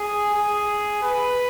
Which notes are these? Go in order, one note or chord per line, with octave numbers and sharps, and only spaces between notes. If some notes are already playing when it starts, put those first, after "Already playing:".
Already playing: G#4
G#4
B4